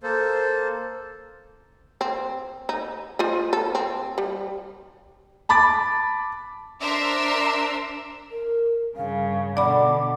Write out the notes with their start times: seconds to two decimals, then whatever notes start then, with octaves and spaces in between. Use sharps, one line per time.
0.03 A#3 A4 C5
2.01 C4
2.69 D#4
3.19 F4 C5 D#5
3.53 A4
3.75 C4
4.18 G3
5.49 A5 B5 D6 A6
6.80 D4 A#4 C5 E5 C6 E6
8.30 A#4
8.97 G2 C#3 F5
9.57 B2 D3 D5 F#5 B5 D6